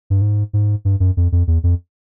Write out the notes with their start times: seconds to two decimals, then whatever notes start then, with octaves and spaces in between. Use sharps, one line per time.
0.10 G2
0.22 G#2
0.53 G#2
0.85 G2
1.00 F#2
1.17 F2
1.32 F2
1.47 E2
1.63 F2